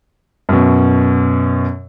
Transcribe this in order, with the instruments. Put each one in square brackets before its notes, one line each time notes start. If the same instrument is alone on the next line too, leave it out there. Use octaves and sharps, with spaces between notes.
[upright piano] F#2 B2